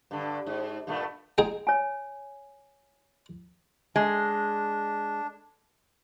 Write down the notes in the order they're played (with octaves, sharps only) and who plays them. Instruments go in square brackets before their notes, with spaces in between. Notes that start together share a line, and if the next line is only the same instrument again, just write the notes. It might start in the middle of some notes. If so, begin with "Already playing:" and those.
[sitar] G2 D3
G#2
G2 A#2 A3
[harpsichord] D#4 G#4 G5
[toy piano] C#5 G#5
[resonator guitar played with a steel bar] G#3 [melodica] D4